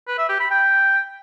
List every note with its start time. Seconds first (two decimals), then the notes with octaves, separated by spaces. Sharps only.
0.08 B4
0.18 E5
0.29 G4
0.40 B5
0.51 G5